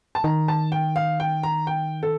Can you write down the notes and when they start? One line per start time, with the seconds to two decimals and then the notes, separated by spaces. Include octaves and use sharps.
0.15 A5
0.24 D#3 A#5
0.48 A5
0.72 G5
0.96 F5
1.20 G5
1.43 A#5
1.67 G5
2.03 A4